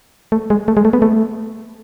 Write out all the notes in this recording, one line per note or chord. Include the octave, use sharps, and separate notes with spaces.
A3
G#3
A3
G#3
A3
B3
A3